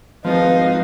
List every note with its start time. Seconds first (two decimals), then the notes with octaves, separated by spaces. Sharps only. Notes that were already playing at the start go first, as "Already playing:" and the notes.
0.25 G#1 F3 D#4 B4 F5